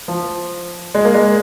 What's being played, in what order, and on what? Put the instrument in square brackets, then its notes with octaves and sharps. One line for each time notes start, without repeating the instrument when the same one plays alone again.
[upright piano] F3
G#3
A#3
G#3